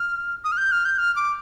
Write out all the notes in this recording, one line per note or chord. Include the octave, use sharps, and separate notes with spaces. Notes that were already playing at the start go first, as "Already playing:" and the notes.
Already playing: F6
D#6
F6
G6
F6
G6
F6
D6